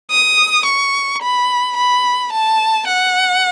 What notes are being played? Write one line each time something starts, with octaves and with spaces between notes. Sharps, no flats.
D#6
C#6
B5
B5
A5
F#5